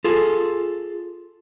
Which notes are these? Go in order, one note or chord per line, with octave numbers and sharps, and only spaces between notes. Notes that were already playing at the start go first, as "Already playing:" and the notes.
F4 G#4 A4